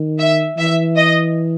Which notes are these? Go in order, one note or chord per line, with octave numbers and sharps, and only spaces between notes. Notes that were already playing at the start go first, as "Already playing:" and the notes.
Already playing: D#3
E5
E3 E5
D#5